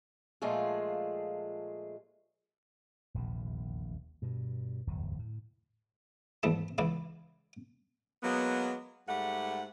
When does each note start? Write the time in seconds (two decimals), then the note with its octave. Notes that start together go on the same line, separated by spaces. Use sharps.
0.42 A#2 F3 G#3 A3 F4 G#4
3.14 D#1 A#1 E2 C3
4.22 G2 B2
4.87 D1 G1 E2 F#3
5.19 A2
6.43 D#2 G#2 E3 G3 E5 A5
6.78 C#2 C#3 E3 E4 D5
8.23 F#3 G#3 A#3 B3
9.08 G#2 G3 A3 F#5